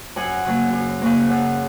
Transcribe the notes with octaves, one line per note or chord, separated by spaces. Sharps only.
F#2 F#5 G#5
C#3 F#3 A#3
F#2
C#3 F#3 A#3
F#2